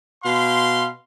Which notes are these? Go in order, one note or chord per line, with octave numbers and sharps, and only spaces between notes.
B2 F5 C6